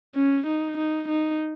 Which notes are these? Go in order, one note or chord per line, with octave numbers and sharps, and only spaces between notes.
C#4
D#4
D#4
D#4